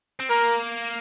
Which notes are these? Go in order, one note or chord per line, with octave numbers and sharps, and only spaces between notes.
C4
A#3 A#4